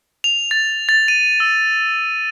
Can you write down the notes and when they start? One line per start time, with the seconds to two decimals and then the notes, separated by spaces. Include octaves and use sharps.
0.24 F7
0.51 A6
0.89 A6
1.08 D#7
1.40 E6